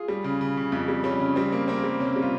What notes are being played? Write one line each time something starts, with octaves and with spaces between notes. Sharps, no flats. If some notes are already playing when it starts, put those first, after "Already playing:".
Already playing: F4 G#4
G3
C#3
C#3
C#3
F2
G3
G3 C#4
C#3
G3 C4
A#3
A#3 C4
G3
C3 C#4
G3
F4